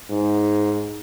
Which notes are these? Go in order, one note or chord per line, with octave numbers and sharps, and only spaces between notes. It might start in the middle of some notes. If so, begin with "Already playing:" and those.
G#2